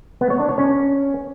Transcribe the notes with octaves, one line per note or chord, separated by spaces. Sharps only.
B3
C#5
D4
C#5
C#4